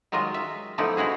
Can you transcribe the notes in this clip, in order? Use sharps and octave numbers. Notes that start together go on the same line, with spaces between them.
D#3 F#3 G#3 F4 D#5
E5
D3 F3 A3 B3 D#4 E4
G#3 E4 F#4 G#4